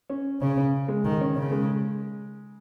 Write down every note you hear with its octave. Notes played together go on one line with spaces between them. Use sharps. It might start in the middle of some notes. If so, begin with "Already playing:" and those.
C#4
C#3 C#4
C#4
G#3
D#3
C#4
C#3 C#4
G#3